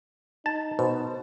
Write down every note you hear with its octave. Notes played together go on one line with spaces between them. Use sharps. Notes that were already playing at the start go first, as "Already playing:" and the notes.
D#4 A5
B2 C5